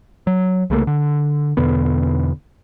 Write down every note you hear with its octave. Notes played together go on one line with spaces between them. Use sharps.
F#3
C2 C#3 A3 A#3
D3
E2 B2 D3 B3